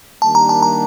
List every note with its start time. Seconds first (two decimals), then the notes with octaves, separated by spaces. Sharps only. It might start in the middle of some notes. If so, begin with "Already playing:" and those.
0.22 D#3 G3 A#3 D4 G4 A5
0.35 A#5
0.49 A5
0.63 A#5